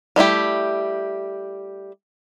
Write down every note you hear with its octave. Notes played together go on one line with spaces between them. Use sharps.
G3 A3 E4 G4